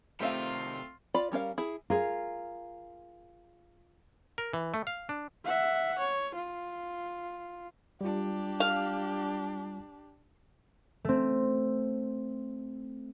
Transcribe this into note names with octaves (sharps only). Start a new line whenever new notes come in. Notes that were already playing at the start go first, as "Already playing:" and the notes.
C3 D#3 A3 C4 F4 G4 E5 F5
F4 D5 B5
G3 C#4 A#4 F5
E4 G#4
F4 G#4 A#4
A#4
E3
A3
F5
D4
E5 F#5
C#5
F4
G3 D4 F4 G4
F5
A3 C4